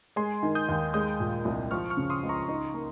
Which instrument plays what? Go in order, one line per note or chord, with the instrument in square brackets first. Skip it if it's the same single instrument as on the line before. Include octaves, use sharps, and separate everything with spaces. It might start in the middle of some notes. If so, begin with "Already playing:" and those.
[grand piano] G#3 [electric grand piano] G#5 C6
[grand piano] D#3
[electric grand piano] D#6 G6
[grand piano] D#2
[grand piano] G#3 [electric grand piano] D#6 G6
[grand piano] A#2
C2
[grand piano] F3 [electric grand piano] C#6 F6
[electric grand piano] C#6 F6
[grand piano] C#3
[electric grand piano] C6 D#6
[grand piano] C#2
[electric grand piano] A#5 C#6
[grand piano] D#4
A#3